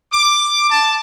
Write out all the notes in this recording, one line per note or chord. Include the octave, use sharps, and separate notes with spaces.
D6
A5